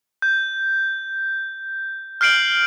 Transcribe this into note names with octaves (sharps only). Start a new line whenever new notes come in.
G6
F6 G6 C7 D7 F#7